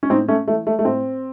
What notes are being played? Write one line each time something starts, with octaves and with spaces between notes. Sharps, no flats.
C#4
A2 C4 D#4
A3 C#4
E3 A3
A3
A3
A2 C4